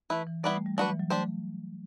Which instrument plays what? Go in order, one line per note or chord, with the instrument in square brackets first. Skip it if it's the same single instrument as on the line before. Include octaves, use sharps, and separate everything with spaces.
[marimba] E3 [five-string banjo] A3 E4 B4
[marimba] E3
[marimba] G3 [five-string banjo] B3 E4 B4 D5
[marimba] A3
G3
[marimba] F#3 [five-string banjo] D4 F#4 B4
[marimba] E3
F#3
[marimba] A3 [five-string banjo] D4 G4 C5